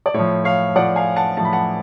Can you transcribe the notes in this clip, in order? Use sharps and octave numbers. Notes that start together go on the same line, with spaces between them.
D5
A2 F3 C#5
C#5 F5
A2 F3 D5 F#5
F5 G#5
F#5 A5
A2 F3 A5
B5
F#5 A5